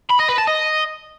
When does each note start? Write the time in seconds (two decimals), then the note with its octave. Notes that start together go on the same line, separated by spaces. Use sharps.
0.10 B5
0.19 D#5
0.28 B4
0.38 A5
0.47 D#5